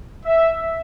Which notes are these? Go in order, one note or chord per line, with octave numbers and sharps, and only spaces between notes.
E5